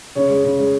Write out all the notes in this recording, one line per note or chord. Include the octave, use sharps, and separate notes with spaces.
C#3 C#5
G#3
C#3
G#3